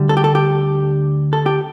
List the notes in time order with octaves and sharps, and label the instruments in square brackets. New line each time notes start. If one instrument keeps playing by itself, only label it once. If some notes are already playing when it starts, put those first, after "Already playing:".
Already playing: [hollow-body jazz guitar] D2 D3 G3
A4
G4
A4
G4
A4
G4